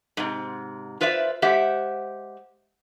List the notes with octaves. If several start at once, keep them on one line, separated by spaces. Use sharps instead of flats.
G#2 C3
F4 B4 C5 D5 E5
G#3 G4 C5 E5 F#5